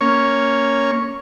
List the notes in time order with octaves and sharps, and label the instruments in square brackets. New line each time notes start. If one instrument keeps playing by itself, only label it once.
[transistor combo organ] A#3 C#4 C#5